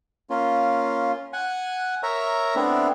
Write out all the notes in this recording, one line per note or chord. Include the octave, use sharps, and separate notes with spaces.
A#3 C#4 F4
F#5 G#5
A#4 C#5 E5 A#5
A3 B3 C4 D4 E4